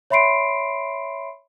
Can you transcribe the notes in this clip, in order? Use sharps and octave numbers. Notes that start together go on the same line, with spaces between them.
C#5 E5 B5 C6 C7 D7